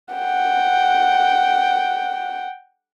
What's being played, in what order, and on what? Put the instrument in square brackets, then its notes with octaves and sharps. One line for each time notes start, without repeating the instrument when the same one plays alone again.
[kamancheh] F#5 G5